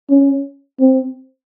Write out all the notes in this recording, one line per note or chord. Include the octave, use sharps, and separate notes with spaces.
C#4
C4